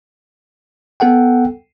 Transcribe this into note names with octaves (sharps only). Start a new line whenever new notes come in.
B3 A4 F#5 G5